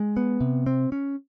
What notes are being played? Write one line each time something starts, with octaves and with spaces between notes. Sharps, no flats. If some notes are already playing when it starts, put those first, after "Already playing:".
Already playing: G#3
B3
C3
C4
C#4